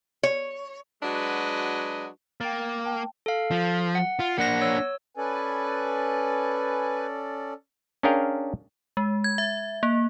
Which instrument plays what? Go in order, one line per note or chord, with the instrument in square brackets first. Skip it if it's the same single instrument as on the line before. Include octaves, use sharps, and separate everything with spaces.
[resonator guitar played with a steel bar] C#5
[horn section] F#3 G#3 D4 F#4 B4 D#5
[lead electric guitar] A#3 [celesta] G5 A6
[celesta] G5 A5
[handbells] A4 F5
[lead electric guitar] F3
[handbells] F#5
[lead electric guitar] F4
[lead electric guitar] A#3 D4 [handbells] F#5 F#6 A#6
[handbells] C#5 E6
[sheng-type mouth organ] C#4 A4 D5 [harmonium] B4 G#5
[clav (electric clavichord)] C#4 D4 G#4 A#4 F5 G5
[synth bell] G#3
G#6
E5
A#3